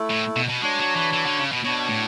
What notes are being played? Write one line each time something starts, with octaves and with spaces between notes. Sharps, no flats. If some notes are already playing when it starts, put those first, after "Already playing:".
Already playing: A3 E4 A4
A2
B2
B2
G#3 D4 F#4 C#5
F#3
E3
E3
D3
C#3
B2
B2 B3 D4 F#4 C#5
A2